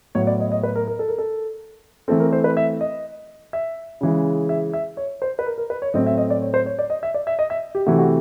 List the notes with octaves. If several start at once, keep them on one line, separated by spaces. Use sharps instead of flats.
A2 F#3 B3 C#5
D5
D#5
D#5
B4
A#4
A#4
A4
A#4
A4
E3 A3 C4 A4
A#4
C5
B4
E5
D#5
E5
C#3 E3 G#3
E5
E5
C#5
C5
B4
A#4
A#4
B4
C#5
A2 F#3 A3 C4 D#5
E5
D#5
D5
C#5
C5
C#5
D5
D#5
E5
D5
E5
D#5
E5
G4
C3 E3 A3 F#4
F#4